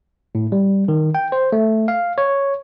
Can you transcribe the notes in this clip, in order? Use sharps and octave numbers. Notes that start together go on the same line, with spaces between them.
A2
G3
D#3
G5
C5
A3
F5
C#5